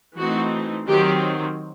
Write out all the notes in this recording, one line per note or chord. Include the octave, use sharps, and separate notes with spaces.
E3 A3 C4 D#4 F#4
D#3 F#3 C4 G4